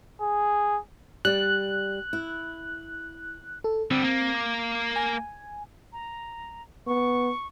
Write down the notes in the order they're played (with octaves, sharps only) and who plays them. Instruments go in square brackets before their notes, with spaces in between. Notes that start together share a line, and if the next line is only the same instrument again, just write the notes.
[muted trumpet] G#4
[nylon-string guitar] G3 D5 [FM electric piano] F#6
[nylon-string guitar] E4
[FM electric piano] A4
[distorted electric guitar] D3 G3 [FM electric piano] C4
[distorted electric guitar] A#3
[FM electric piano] D6
G#5
[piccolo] A#5
[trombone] B3 [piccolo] C#6